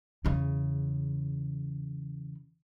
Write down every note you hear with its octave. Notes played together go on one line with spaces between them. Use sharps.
E2 C#3